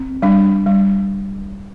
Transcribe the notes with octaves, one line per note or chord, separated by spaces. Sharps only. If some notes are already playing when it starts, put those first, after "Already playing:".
Already playing: C4
G3 D4
G3